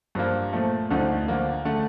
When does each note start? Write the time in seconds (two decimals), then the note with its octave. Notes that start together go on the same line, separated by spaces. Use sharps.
0.15 G2 F3 A#3
0.53 A#2 F3 A3
0.90 D2 D3 F3 A3 D#4
1.28 D3 F3 A#3
1.65 D3 A3